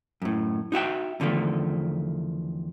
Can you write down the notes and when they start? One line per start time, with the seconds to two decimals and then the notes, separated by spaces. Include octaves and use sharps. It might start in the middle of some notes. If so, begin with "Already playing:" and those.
0.22 F#2 A2
0.72 D#4 F#4 E5 G5
1.20 E2 D3 D#3 F3 A3